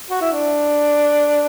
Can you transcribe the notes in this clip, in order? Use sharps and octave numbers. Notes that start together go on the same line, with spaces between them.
F#4
E4
D4